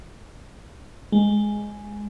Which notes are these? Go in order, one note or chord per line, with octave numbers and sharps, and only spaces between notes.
G#3